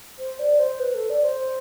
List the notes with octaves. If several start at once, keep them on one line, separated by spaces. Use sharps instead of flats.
C5
D5
C5
B4
A4
D5
C5